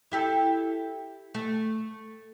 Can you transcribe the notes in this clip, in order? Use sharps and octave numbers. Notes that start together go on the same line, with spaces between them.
E4 G4 A4
A3